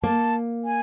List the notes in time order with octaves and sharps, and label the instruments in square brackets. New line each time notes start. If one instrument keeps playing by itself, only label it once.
[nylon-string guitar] A#3 [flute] A5
[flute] G#5